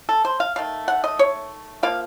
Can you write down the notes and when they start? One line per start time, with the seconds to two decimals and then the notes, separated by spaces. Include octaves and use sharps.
0.09 A4
0.25 C5
0.40 F5
0.56 D#3 A3 F5
0.88 F#5
1.04 D#5
1.19 C#5
1.83 F3 A#3 F5